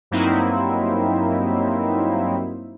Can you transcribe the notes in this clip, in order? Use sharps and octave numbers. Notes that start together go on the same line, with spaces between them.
G2 F#3 A#3 C4 D#4 E4